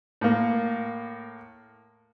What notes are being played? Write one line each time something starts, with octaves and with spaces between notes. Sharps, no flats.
A2 A#3